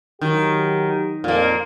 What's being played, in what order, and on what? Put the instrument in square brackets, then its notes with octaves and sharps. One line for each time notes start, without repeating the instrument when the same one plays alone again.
[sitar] D#3 [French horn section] F#3 G4
[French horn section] F2 [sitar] A#2 A#3